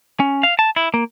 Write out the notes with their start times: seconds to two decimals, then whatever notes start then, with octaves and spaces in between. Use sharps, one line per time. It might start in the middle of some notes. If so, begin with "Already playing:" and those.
0.20 C#4
0.43 F5
0.59 A5
0.76 E4
0.94 A#3